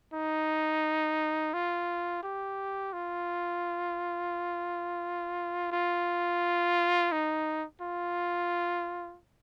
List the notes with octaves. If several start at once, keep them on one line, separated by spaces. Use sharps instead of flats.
D#4
F4
G4
F4
F4
D#4
F4